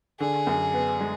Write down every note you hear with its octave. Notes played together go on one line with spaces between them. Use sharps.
D3 G#4
F#2
B3
G#3